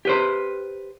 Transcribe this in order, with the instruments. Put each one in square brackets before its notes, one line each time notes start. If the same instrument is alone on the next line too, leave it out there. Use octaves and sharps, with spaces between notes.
[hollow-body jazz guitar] G4 B4 C5